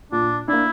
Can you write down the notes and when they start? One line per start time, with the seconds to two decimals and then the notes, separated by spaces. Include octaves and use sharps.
0.12 A#2 D4
0.48 A#3 D4 E4